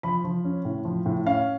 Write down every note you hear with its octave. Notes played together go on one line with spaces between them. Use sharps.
F3 B5
F3
C#4
A2
F3
A2
C#4 F5